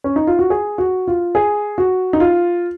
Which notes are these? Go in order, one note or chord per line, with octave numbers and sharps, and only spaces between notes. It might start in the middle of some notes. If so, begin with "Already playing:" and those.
C#4
D#4
F4
F#4
G#4
F#4
F4
G#4
F#4
D#4
F4